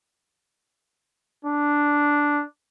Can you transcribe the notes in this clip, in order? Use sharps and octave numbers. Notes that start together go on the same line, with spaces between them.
D4